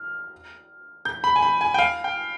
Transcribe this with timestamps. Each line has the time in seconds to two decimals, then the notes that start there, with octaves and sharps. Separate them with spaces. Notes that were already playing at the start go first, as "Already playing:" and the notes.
Already playing: F6
1.05 G6
1.24 B5
1.36 G#5
1.42 B5
1.61 G#5
1.74 G5
1.79 F5
2.04 G5